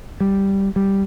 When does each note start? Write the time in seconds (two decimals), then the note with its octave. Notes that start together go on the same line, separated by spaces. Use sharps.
0.21 G3
0.76 G3